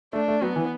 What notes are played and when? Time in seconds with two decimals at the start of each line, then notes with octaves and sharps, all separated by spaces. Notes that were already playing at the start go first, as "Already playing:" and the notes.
0.13 A3 D4
0.28 A3
0.42 F#3 B3
0.56 E3